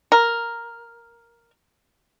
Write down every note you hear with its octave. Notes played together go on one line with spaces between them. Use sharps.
A#4